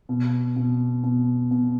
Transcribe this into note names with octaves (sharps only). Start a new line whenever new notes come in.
B2
B2
B2
B2